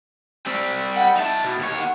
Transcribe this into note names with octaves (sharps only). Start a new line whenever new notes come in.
G3 C4
F#5 G5 B5
D#4 E4 A5
B2
D#2 C#5
F#5